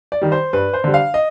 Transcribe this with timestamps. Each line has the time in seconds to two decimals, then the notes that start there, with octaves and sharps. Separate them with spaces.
0.12 D5
0.22 D#3 G3
0.32 C5
0.53 G2 B4
0.73 C5
0.84 D3 G3
0.94 F5
1.14 D#5